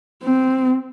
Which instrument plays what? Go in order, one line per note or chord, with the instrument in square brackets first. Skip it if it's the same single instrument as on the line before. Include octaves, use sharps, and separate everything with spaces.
[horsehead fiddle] C4